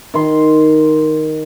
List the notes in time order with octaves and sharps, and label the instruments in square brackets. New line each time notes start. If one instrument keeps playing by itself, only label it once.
[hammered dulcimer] D#3 C6